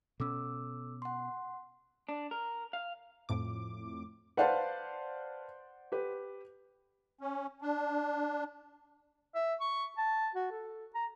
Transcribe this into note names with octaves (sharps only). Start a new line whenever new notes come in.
B2 C#4 A4 D6 E6
F#5 C6
D4
A#4
F5
F2 A2 D6
B4 C5 D5 F5 F#5 A5
G4 B4
C#4
D4
E5
C#6
A5
F#4
A4
A#5